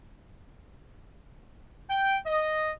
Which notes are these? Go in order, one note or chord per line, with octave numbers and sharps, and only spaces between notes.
G5
D#5